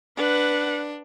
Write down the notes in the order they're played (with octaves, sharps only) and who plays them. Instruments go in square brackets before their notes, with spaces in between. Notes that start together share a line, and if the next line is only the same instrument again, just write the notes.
[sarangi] D4 [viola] B4 F#5